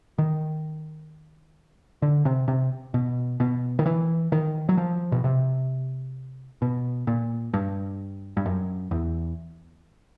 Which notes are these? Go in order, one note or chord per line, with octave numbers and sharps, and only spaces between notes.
D#3
D3
C3
C3
B2
B2
D#3
E3
D#3
F#3
F3
B2
C3
B2
A#2
G2
G2
F#2
E2